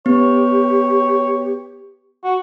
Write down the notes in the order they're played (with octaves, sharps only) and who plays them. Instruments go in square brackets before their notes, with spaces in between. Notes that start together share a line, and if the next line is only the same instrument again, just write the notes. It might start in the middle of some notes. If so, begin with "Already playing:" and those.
[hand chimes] B3 [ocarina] G4 [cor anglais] C#5
[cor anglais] F#4